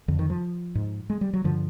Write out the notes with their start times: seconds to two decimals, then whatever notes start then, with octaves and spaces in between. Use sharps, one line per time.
0.08 F2 D3
0.19 D#3
0.30 F3
0.75 G#2
1.10 G#3
1.21 G3
1.33 F#3
1.44 G2 D3 F3